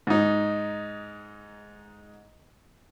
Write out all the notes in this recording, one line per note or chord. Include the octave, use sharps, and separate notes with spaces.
G#2 D#4